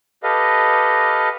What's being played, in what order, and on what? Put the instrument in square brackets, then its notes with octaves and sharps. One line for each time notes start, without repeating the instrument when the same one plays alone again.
[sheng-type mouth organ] G4 A4 B4 D#5 F5